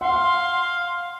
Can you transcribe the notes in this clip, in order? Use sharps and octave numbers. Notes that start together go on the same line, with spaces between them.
F5 F#5 C6